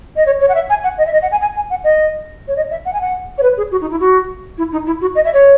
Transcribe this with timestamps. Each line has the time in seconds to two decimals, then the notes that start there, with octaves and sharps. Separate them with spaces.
0.16 D#5
0.26 C#5
0.40 C#5
0.48 F#5
0.54 E5
0.69 G#5
0.83 F#5
0.98 D#5
1.06 E5
1.12 D#5
1.22 F#5
1.31 G#5
1.41 G#5
1.55 G#5
1.70 F#5
1.84 D#5
2.47 C#5
2.56 D#5
2.70 E5
2.85 F#5
2.93 G#5
3.01 F#5
3.38 C#5
3.42 B4
3.57 G#4
3.71 F#4
3.81 D#4
3.90 E4
4.00 F#4
4.57 E4
4.72 D#4
4.86 E4
5.01 F#4
5.15 D#5
5.24 E5
5.33 C#5